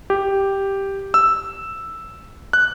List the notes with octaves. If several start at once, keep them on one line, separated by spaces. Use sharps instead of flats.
G4
E6
F#6